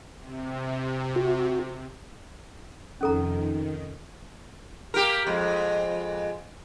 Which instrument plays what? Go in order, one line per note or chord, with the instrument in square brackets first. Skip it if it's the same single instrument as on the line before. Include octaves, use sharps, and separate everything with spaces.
[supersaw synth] C3
[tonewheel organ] F#4
[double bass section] F2 C3 [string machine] D#3 [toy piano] C#4 A4 A#5
[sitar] A#3 G4 A#4
F2 G#3